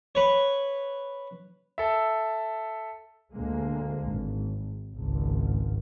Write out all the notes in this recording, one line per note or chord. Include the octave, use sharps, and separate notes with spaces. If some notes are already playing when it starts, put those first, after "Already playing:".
B4 C#5
A4 E5
D2 D3 G#3 A#3
G#1
G#1 C#2